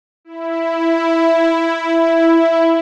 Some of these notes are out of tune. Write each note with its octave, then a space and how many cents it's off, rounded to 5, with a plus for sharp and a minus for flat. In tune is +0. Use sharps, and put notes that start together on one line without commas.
E4 +5